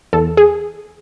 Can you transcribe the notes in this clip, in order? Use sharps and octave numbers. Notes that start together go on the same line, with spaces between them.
E2 A4
G#4